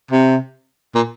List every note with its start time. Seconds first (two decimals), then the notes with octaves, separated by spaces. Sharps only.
0.11 C3
0.95 A#2